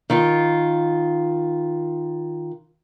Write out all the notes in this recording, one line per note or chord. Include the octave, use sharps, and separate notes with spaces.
D#3 F4